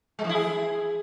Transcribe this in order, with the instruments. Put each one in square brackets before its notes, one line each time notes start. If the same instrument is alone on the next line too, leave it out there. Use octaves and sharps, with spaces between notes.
[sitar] G#3
E3
E4
G#4